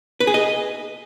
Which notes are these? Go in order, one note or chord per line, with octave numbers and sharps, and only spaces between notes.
B4
G#4
D#5